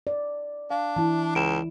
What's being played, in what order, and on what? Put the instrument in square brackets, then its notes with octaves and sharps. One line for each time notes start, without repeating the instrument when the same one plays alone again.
[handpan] D5
[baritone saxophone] D4 [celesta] F5
[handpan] E3 E4 [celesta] A5
[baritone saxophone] C#2 [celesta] D7 E7